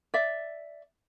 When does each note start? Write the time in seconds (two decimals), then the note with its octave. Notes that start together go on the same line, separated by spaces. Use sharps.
0.14 D5 E5